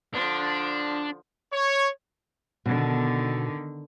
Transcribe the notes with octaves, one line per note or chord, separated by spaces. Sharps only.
D3 F3 D4
C#5
B2 D3 D#3